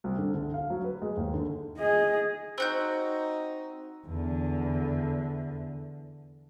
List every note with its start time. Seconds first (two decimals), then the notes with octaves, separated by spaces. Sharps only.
0.04 C2
0.18 D3
0.34 D3
0.54 F5
0.70 F#3
0.84 B4
1.02 G#3
1.17 D#2
1.34 D3
1.78 G#4 D#5
2.58 C4 D#4 F#4 G6
4.07 E2 D3